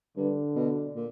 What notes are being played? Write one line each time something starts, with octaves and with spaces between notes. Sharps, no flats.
G2 D3
B2
A#2